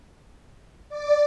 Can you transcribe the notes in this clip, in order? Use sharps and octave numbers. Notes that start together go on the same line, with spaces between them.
D5